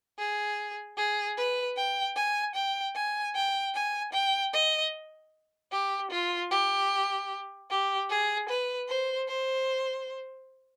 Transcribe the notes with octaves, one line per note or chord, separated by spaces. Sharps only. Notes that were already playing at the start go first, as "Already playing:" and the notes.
G#4
G#4
B4
G5
G#5
G5
G#5
G5
G#5
G5
D#5
G4
F4
G4
G4
G#4
B4
C5
C5